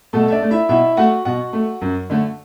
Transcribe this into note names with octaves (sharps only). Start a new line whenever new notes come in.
B2 A3 A4
E5
D4 D5
A3
E4 E5
B2 E4 E5
A3 F#4 F#5
B2 F#4 F#5
A3
F#2
D3 A3